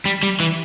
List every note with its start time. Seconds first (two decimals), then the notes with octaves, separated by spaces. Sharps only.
0.06 G3
0.23 G3
0.40 E3